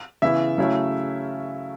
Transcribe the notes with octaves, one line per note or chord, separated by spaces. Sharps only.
C#3 E3 B3 E4 E5
C#3 F#3 A3 C#4 E4